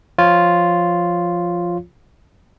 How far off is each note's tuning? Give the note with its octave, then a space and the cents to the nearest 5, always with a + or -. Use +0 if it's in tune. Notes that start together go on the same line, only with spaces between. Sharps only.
F3 +0 F4 +0 C#5 +0